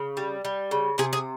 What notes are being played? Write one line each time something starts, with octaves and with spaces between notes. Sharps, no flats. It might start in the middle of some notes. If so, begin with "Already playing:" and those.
Already playing: C#3
G3
G3
C#3
C3 G#4
G#4